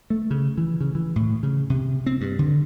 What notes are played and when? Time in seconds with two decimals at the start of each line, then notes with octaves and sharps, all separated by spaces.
0.10 A3
0.31 C#3
0.58 E3
0.81 C#3
0.95 E3
1.16 A2
1.43 C#3
1.70 C3
2.06 C4
2.21 G2
2.39 D3